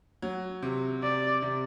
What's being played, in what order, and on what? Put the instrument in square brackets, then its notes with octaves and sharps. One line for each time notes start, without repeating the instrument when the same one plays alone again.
[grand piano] F#3
C3
[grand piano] C3 [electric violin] D5
[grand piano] C3